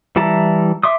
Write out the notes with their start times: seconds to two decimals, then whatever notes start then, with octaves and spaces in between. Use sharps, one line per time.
0.16 E3 G3 E4 A5 A#5
0.83 E5 C6 D6 D#6